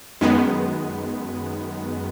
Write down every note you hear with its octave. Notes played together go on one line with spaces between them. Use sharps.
F#2 D#3 G#3 B3